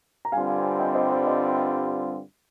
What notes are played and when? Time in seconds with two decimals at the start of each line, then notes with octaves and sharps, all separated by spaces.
0.25 A#5
0.32 G2 D3 G3 C4 F4 F5 G#5
0.79 D#5 G5
0.95 C5 D#5
1.11 C5
1.27 C5 D#5